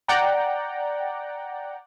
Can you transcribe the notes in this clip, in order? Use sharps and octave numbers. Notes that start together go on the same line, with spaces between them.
D5 F#5 G5 A#5